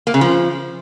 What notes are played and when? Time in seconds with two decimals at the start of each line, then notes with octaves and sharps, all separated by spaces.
0.07 A#3
0.14 C#3
0.21 F3